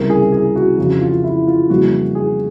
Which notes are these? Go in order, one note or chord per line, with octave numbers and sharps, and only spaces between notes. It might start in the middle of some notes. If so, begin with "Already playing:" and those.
Already playing: C#2 C3 E3 G3 A#4
G#4
G#4
F#4
F2 C#3 E3 F#4
F4
E4
F4
F2 C#3 E3 G3 A#3 F#4
G#4